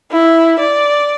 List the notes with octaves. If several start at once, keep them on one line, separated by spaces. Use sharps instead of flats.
E4
D5